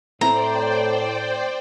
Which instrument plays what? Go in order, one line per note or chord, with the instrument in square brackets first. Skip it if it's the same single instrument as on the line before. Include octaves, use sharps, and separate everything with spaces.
[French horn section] A2 [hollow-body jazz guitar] A3 C4 E4 [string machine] C5 D5 G5 [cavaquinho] A#5